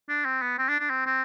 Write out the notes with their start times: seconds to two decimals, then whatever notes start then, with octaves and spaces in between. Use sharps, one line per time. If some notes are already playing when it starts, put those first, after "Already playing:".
0.09 D4
0.25 C4
0.42 B3
0.58 C4
0.69 D4
0.80 D4
0.90 C4
1.06 C4